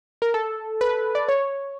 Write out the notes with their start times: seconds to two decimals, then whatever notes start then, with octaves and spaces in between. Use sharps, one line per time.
0.22 A#4
0.34 A4
0.81 B4
1.15 D5
1.28 C#5